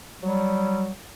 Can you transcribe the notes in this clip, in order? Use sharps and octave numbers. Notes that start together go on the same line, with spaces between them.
F#3 G3